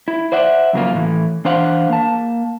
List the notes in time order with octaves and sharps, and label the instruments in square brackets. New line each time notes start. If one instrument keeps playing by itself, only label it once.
[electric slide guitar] E4
C5 D5 E5 F#5
F2 C#3 F#3 A#3 F4
A2 E3
E3 D4 C5 F5 F#5
A#3 A5